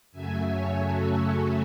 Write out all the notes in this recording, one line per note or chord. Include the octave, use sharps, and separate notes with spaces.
F#2 C#3 F#3 A3 E5 G#5
C#5 E5
F#4 A4
F#4 A4